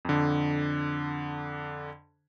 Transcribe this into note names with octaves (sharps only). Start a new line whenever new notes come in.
F2 D3